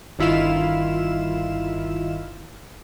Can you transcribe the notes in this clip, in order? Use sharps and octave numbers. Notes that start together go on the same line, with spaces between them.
G1 D#3 E4 F4 F5 E7